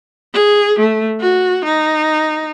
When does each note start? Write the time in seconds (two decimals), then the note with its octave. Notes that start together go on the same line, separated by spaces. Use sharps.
0.33 G#4
0.79 A3
1.20 F#4
1.65 D#4